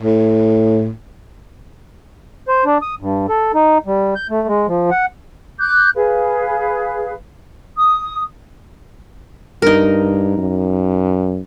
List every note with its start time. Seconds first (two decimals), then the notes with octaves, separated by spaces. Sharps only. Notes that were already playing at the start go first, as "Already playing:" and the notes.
0.02 A2
2.48 C5
2.65 D4
2.82 D#6
3.01 G2
3.29 A4
3.54 D#4
3.86 G3
4.16 G6
4.30 A3
4.48 G#3
4.68 F3
4.91 F#5
5.59 D6 F#6 G6
5.96 G#4 B4 F5
7.76 D#6
9.62 G2 D#4 A#4
10.38 F#2